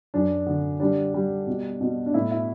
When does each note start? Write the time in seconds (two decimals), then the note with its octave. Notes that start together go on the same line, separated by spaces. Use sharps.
0.14 F#2 D4
0.47 D3
0.80 G3 D4
1.14 G3
1.47 B2
1.81 B2
2.06 D4
2.14 A2 E4
2.31 E4